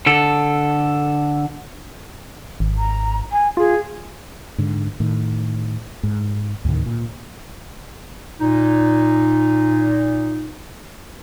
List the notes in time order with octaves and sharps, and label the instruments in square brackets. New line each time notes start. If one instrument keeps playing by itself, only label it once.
[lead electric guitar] D3 A4
[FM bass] G#1
[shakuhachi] A#5
G#5
[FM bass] F4 [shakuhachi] G#4
[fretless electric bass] G#2 D3
A2 D#3
G#2
D2 A2 C3 D#3
A#2
[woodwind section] A#2 D#4